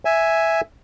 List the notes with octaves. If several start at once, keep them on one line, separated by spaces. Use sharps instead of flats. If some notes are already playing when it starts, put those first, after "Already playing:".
E5 G#5